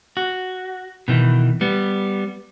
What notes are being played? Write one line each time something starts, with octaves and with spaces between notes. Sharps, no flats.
F#4
B2 D#3 E3
G3 B3